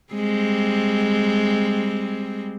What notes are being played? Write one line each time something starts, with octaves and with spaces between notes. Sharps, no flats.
G3 G#3 C4